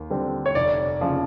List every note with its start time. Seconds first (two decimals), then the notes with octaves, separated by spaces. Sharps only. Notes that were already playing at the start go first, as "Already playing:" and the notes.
Already playing: D#2
0.10 D3 G3 C4
0.46 C#5
0.55 F1 D5
1.01 C#3 F3